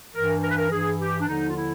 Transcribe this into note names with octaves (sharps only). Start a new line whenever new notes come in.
G2 E3 A#4
A#4
B4
A#4
G2 E3 G#4
G4
D4
D#2 D3 F3 D#4
F4
E4